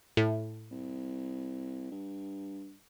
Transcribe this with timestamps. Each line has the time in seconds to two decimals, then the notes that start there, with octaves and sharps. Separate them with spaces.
0.17 A2
0.71 C2
1.91 G2